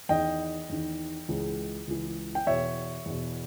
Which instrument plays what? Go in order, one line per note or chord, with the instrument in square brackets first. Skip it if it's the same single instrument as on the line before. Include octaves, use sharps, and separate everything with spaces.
[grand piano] E2 D#3 D#5 G5
E2 D#3
C#2 C#3 E3
C#2 C#3 E3
G5
E2 B2 C#5 E5
E2 B2